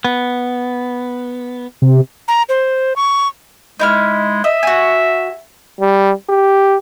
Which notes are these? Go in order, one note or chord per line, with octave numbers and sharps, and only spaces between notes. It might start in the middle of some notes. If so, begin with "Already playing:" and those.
B3
C3
A#5
C5
C#6
G#3 D#4 E4 F6
D#5 E5
F#4 G#5
G3
G4